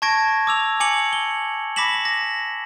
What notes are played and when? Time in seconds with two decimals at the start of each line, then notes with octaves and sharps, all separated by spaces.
0.02 A5 C#6 G#6 A#6 D7
0.47 D6 E6 F7
0.80 G#5 D6 C#7 F#7
1.13 G7
1.76 B5 D6 A#6 B6 E7 F#7
2.05 A#6